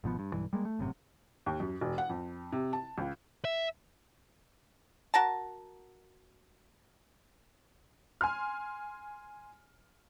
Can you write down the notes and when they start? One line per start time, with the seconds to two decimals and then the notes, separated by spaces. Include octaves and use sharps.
0.04 G#1 B2 F3 B3
0.19 G2
0.33 B1 G2 E3
0.53 G3 G#3 A#3
0.65 A3
0.79 G1 F#2 A2 C3
1.46 D#2
1.60 F#2
1.81 E1
1.98 F#5
2.09 F2
2.52 C3
2.73 A5
2.98 C#2
3.45 E5
5.14 F#4 A#4 A5
8.21 G#5 C6 F6